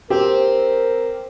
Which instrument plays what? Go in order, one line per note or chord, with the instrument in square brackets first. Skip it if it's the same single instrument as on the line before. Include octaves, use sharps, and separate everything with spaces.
[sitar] C4 [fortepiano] G4 [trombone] A#4